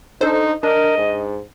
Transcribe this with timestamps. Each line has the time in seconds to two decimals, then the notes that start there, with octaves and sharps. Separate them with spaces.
0.21 D4 D#4 A4 C5
0.63 D4 A#4 D#5
0.97 G#2